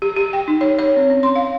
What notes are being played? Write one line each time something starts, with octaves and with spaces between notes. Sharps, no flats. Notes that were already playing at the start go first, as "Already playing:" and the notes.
G4
G4
G5
D#4
C#5
C#5
C4
C#4
C6
F5